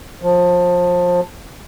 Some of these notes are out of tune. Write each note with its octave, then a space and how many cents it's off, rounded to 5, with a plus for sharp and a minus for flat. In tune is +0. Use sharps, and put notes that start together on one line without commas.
F3 +25